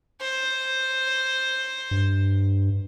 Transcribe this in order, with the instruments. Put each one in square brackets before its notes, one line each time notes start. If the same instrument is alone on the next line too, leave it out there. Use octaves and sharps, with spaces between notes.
[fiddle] C5
[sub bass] G2